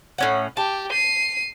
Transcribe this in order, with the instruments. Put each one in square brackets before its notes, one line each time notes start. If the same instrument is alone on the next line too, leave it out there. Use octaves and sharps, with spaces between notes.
[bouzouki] A2 C#4 F#5
[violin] G4 [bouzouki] A5
[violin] C7 D#7